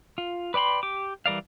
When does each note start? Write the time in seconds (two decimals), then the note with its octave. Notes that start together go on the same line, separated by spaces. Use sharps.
0.18 F4
0.54 B4 D5 G5 B5 C6
0.83 G4 D6
1.26 E3 G3 A#4 D5 F5